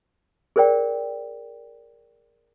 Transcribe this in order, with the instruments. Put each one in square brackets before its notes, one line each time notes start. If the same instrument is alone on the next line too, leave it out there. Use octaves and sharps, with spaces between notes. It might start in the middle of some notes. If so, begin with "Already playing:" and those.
[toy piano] G#4 A#4 C5 D5 G5